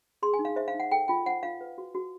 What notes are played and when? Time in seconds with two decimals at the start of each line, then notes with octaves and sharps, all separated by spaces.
0.22 G#4 C6
0.33 G#5
0.39 D#4
0.45 F5
0.56 C5 E5
0.68 F5
0.75 D#4 F#5
0.92 A4 G5
1.08 F4 G5
1.26 C5 F#5
1.43 F4 F5
1.61 B4
1.78 F#4
1.95 F#4